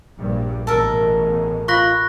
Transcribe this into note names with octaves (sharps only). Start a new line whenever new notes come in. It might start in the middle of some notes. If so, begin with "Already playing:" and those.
A#1 G2 A#2
A1 B2 G#3 A4 A#4
F4 B5 C#6 F#6 A#6